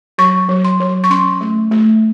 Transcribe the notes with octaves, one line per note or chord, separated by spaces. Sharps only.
F#3 C#6
F#3
C6
F#3
C#6
C#4 C6
A3
A3